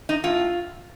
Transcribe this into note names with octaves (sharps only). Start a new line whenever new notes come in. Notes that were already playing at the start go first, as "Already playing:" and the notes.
D#4
A2 F4